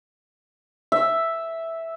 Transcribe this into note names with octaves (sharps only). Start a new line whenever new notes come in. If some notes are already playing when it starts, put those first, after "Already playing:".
E5